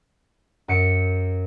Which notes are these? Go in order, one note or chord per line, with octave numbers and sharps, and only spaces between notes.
F#2 C#7 D7